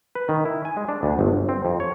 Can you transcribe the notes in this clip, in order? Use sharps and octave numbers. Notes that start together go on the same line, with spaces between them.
B4
D#3
E4
G#5
G#3
D4
D2
G1
G1
C4
F2
C#5